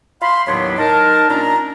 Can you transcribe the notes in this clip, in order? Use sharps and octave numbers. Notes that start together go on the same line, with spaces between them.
F5 B5 C6
D#2 A2 F#3 B3 D4 C#5
D#4 A#4 A5
A#2 C#4 D4 A#5